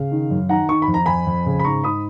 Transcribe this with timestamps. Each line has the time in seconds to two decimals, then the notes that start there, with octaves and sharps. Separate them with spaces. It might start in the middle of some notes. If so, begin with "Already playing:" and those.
Already playing: C#3 F5
0.11 D#3
0.31 F#2
0.49 D#3 F#5 A#5
0.69 D#3 C#6
0.82 B5
0.88 F2
0.94 A#5
1.06 F2 G#5 B5
1.27 F2
1.46 C#3
1.59 B5
1.64 G#2 A#5 C#6
1.84 G#2 B5 D#6